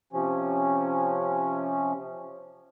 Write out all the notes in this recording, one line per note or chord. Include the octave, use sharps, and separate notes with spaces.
C3 F3 C#4